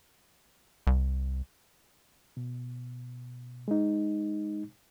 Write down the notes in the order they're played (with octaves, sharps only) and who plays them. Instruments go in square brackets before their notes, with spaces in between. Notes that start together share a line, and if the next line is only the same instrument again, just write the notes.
[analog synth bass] C2
[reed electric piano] B2
G#3 D#4